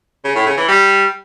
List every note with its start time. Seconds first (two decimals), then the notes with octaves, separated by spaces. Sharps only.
0.24 C#3
0.35 A2
0.46 C#3
0.57 E3
0.68 G3